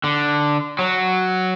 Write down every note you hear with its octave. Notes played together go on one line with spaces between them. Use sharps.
D3
F#3